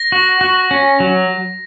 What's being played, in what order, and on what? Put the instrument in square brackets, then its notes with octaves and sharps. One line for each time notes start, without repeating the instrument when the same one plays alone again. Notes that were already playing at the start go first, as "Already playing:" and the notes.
Already playing: [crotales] A#6
[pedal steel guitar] F#4
F#4
C#4
F#3